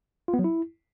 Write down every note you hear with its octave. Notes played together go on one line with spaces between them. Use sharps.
F4
B3
F#3
E4